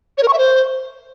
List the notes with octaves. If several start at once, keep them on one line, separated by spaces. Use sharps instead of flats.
C#5
A#4
C#6
E5
C5